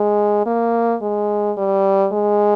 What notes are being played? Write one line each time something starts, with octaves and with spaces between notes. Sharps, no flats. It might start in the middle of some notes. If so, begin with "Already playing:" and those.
Already playing: G#3
A#3
G#3
G3
G#3